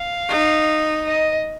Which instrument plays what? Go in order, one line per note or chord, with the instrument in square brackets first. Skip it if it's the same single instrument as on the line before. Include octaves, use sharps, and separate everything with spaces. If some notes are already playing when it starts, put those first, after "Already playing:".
Already playing: [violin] F5
[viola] D#4
[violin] D#5